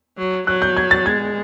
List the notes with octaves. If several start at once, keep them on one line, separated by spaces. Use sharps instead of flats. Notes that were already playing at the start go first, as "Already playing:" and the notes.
F#3
F#3 F#6
G6
G#6
A6
G#3 G#6